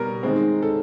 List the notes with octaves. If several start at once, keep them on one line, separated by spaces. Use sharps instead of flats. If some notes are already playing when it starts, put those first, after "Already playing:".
Already playing: B2 G3 A#4
D#3 G#3 C4
A4